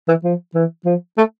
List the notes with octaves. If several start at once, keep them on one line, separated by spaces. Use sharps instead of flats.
E3
F3
E3
F3
A3